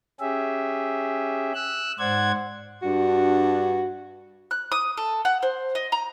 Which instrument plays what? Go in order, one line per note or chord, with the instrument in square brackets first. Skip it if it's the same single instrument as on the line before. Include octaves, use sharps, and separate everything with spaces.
[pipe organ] C#4 G4 G#4 E5
E6 F#6
G#2 C5 D5 F#5 G#6
[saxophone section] G2 D4 F#4
[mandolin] F#6
D#6
A4
F#5
C5
D#5
A#5